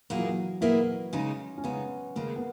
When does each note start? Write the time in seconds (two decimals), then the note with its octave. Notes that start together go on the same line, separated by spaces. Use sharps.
0.10 A#2 F#3 A#3 E4 G#4
0.18 E3
0.27 F#3
0.61 A#2 A#3 B3 E4 G#4
1.13 C#3 G#3 C#4 D#4
1.58 C#4
1.64 C#3 G#3 B3 D#4
2.16 D#2 C#3 G#3 A#3
2.36 B3